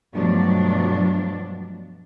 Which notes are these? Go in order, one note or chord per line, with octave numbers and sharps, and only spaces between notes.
G2 B2 F3 F#3 A3 D4